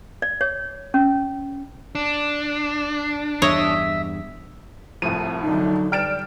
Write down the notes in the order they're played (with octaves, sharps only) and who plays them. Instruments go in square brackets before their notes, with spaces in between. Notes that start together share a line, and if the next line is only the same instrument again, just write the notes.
[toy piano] D5
C#5
C#4
[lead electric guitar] D4
[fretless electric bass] E2 G2 [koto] C#5 [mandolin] D#5 E5
[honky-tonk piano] C2 D#7 [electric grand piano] A2 F3
[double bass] D3 F#3 [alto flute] D#4
[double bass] G3 [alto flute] D5 [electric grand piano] G5 A6 [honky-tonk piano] F6 D7 E7